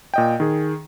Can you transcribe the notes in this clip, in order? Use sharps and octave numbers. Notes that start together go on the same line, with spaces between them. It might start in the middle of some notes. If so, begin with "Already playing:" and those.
A#2 D#5 G5
D#3 G#4